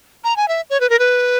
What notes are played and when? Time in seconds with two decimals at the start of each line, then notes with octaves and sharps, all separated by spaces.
0.24 A#5
0.37 G#5
0.48 E5
0.70 C#5
0.81 B4
0.90 A#4
0.99 B4